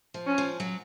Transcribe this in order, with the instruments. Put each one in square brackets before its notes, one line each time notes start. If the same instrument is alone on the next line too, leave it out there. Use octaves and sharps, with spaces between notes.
[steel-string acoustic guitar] F3
[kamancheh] C#4
[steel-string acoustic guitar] F3
F#3